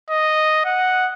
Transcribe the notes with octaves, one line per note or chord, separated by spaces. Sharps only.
D#5
F#5